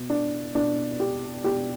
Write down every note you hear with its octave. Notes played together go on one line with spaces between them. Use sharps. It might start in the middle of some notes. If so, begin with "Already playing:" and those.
Already playing: B2
D4
B2 D4
G4
B2 G4